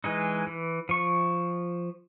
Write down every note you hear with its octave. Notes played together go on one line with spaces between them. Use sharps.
E3 G#3 D#4
E3
F3 C#6